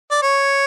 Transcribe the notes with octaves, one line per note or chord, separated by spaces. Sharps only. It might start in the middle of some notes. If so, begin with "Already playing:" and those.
D5
C#5